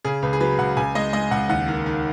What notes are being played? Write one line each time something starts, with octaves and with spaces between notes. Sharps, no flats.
C#3 G#4
C#2 B4
G#4
F#3 B4
C#2 F#5
C#2 G#5
G#3 D#5
G#3 D#5
C#2 F#5
D#2 F#5
D#3
D#3